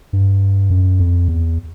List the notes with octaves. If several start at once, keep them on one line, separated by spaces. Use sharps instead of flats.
G2
F#2
F2
E2